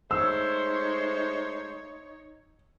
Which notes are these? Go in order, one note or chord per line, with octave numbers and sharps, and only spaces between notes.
G#3 A3 D#4 C5 C#5 E6